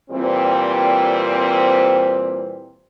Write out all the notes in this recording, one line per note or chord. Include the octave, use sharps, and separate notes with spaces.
A#2 E3 G3 C4